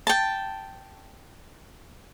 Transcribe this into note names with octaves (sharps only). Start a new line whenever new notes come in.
G5 A5